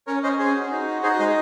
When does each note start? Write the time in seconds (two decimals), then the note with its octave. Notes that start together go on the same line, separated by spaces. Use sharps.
0.07 C#4 A#4 C#5
0.23 C#4 C5 D#5
0.39 C#4 G#4 C5
0.55 F#4
0.71 D#4
0.87 F#4
1.03 D#4 G#4 C5
1.19 G#3 C5 D#5